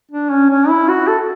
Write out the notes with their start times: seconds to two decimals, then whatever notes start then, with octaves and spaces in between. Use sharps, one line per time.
0.11 D4
0.30 C#4
0.49 C#4
0.69 E4
0.88 F#4
1.08 A4